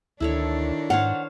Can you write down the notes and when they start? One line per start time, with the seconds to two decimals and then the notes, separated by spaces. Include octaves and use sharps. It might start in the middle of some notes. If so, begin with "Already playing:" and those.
0.20 D2 D#3 D4 E4 A4 C#5
0.90 G#2 C5 C#5 F5 F#5